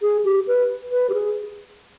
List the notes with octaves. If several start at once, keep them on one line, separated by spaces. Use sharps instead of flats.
G#4
G4
B4
B4
G4
G#4